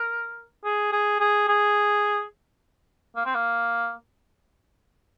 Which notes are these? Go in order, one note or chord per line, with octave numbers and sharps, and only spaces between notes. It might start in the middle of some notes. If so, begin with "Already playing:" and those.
Already playing: A#4
G#4
G#4
G#4
G#4
A#3
C4
A#3